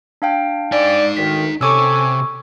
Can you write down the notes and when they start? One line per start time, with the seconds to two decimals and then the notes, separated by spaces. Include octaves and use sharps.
0.22 D4 F5 G5
0.72 D#4 D5 G#5
1.17 D2 D#3 B6
1.61 C3 C#4 A4 G#5 C#6 D6 E6